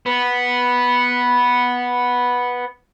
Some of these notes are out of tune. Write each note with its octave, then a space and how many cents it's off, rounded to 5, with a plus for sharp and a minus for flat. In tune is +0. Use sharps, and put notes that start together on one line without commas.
B3 -5